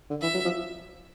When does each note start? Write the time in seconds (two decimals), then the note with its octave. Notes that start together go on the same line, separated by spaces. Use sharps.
0.10 D3
0.22 E3 E5
0.34 F#3
0.45 F3